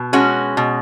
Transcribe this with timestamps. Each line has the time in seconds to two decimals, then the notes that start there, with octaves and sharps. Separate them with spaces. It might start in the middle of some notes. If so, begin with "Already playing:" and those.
Already playing: B2
0.13 G#3 C#4 F#4
0.57 B2